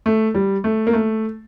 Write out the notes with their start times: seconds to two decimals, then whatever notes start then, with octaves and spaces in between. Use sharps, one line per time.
0.06 A3
0.35 G3
0.64 A3
0.87 A#3
0.93 A3